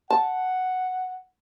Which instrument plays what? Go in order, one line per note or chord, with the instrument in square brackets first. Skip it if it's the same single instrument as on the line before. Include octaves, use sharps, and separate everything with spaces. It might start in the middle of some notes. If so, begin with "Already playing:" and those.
[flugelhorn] F#5 [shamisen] A5